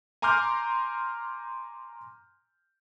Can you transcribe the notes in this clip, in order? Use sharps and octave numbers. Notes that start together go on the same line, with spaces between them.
G#5 A#5 C6 D6 F6 G6